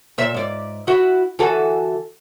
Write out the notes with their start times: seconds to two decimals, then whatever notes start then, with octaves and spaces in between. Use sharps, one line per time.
0.18 A#2 E5
0.34 G#2 D5
0.87 E4 F#4
1.39 E3 F#4 A4